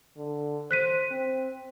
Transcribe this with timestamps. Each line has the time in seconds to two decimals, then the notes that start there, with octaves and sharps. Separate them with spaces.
0.18 D3
0.71 C5 F#6 B6 D#7
1.11 C4